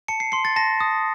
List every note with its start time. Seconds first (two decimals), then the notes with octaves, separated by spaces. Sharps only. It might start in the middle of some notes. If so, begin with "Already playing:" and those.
0.08 A5 C#7
0.20 C7
0.32 C6 C7
0.45 A6
0.56 A5 A#6
0.80 D#6